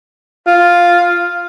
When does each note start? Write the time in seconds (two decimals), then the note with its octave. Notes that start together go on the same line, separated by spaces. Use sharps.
0.47 F4